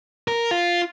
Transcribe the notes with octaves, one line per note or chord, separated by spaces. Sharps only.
A#4
F4